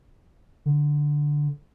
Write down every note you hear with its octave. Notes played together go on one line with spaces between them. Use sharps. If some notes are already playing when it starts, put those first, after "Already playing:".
D3